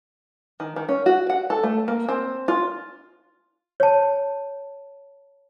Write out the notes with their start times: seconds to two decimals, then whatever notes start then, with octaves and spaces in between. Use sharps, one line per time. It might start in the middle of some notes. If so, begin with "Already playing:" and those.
0.60 D#3
0.76 D#3
0.89 C#4
1.06 F#4
1.30 F#5
1.50 A4
1.63 A3
1.88 A#3
2.08 C4
2.48 F4
3.80 C#5 A5